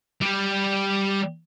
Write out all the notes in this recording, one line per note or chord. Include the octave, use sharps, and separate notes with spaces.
G3 G4